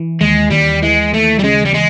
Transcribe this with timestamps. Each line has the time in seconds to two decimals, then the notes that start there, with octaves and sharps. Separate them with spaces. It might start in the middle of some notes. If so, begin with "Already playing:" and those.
Already playing: E3
0.21 D#2 G#3
0.51 D#2 G3
0.82 E3 G#3
1.13 D#2 A3
1.39 G3
1.44 C#3 G#3
1.65 G3
1.74 G#3